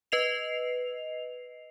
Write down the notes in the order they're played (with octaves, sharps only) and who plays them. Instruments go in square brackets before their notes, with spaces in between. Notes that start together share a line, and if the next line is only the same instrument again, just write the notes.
[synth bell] B4 D#5 C7 F7